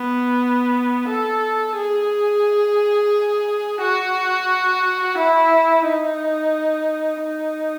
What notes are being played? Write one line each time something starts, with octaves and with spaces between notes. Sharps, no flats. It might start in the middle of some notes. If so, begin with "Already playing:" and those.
Already playing: B3
A4
G#4
F#4
E4
D#4
D#4